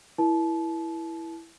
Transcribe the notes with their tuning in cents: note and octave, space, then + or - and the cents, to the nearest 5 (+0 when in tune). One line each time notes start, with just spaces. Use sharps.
E4 +0 A#4 +40 A5 -30